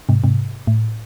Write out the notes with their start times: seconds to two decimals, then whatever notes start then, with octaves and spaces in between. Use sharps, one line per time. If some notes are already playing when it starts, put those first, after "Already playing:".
0.09 G#2 C3
0.24 G#2 C3
0.67 A2